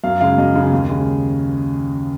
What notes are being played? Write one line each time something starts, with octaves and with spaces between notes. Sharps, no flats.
F#2 F5
C#3 G#3 F5
F#2 D#5
C#3 G#3
D#2
C#3 G#3